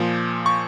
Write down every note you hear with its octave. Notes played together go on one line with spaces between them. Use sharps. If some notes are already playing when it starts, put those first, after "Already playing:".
Already playing: A#2 F3
C#6